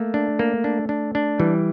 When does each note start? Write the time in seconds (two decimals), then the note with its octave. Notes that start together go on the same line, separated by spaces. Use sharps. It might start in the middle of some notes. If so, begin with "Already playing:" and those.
Already playing: A3 A#3
0.14 D4
0.39 A#3
0.64 D4
0.89 D4
1.15 D4
1.40 E3 G3